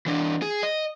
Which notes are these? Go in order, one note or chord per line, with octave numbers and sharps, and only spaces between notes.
E3 D4
G#4
D#5